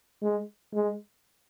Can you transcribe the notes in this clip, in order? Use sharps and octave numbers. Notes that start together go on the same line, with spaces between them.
G#3
G#3